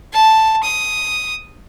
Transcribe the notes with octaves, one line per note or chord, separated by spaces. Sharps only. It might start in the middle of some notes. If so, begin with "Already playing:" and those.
A5
D#6